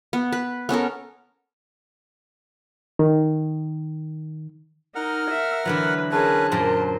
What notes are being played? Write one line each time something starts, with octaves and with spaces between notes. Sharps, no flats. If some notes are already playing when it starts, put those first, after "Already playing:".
B3
B4
B3 C#4 A4 A#4
D#3
D#4 A#4 F#5 F6
E5
D3 E3 F#3 B4
C#4 G#4 A#4 B4 G#5 A5
F#2 A#2 F#3 A#4 C5